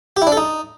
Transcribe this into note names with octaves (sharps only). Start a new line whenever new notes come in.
G4
E4
D4
A4
D#4